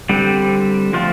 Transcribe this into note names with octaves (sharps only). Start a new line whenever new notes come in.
D3 G3 C4
F3 A3 C4 F4